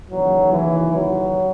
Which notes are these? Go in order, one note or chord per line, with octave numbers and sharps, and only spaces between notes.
D#2 C#3 E3 F#3
E3
F#3